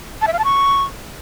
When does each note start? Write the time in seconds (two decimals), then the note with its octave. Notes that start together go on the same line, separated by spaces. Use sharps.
0.22 A5
0.27 E5
0.33 F5
0.39 A5
0.45 C#6